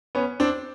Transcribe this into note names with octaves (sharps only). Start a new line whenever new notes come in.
B3 C#4
C4 D4